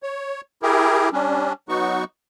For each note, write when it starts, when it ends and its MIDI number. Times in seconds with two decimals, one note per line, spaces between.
0.03 0.41 73
0.62 1.09 64
0.62 1.09 67
0.62 1.09 68
0.62 1.09 70
1.13 1.53 55
1.13 1.53 61
1.13 1.53 62
1.69 2.04 54
1.69 2.04 59
1.69 2.04 63
1.69 2.04 66
1.69 2.04 85